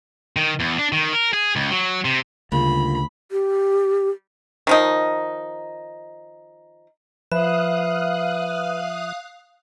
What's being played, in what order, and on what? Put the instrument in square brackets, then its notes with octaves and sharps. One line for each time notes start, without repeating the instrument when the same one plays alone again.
[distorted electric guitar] D#3
E2
D4
D#3
A#4
G#4
C#2
F#3
C3
[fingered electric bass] D2 [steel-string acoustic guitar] G2 A#3 F4 [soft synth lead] C#3 [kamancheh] B5
[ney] G4
[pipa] D#3 F3 D#4
[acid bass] F3 [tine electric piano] B4 [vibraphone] E5 [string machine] F5 D#6 F#6